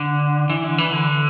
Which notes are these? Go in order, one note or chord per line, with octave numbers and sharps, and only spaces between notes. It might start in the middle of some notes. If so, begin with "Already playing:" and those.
Already playing: D3
E3
D3
E3
D3